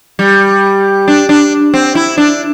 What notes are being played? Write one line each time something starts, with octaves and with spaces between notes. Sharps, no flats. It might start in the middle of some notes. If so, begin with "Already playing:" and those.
G3
D4
D4
C4
E4
D4